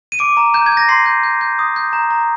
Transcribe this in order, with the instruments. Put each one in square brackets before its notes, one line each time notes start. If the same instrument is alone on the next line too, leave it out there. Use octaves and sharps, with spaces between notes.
[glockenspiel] D#7
D6 D7
A#5
A#5 G6
G#6
G6
A#6
C6 C7
G6
G6
G6
D#6
G6
A#5
A#5